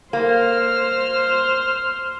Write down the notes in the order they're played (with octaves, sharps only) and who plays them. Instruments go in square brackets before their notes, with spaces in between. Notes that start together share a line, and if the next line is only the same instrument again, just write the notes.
[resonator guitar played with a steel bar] A#3 [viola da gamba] C5 [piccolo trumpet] F6